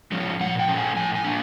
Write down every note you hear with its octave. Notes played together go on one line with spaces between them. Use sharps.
F3 G#3 C#4
A#2 F#5
G5
F3 A3 C#4
G#5
A2 G#5
G#5
A#3 D4